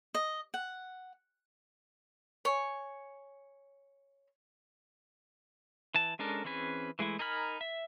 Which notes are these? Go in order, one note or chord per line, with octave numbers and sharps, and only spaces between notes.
D#5
F#5
C#5 G#5
E3 A5
G#3 C#4 D4 A4 A#4
E3 C4 C#4 G#4 B4
E3 G#3 A3 E4
D#4 A#4 G#5 B5 F6
E5